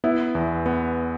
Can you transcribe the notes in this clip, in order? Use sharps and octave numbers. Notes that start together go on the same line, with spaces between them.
B3 E4
E2
B3